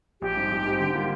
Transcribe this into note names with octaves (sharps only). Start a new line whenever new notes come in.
A#1 G4
G#2 G3 C4
A#1
G#2 G3 C4
D3
G3 A#3 F4